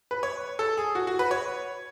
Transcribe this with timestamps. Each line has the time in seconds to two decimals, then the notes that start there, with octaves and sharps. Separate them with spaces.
0.11 B4
0.23 C#5
0.59 A4
0.77 G#4
0.95 F#4
1.07 F#4
1.19 B4
1.31 C#5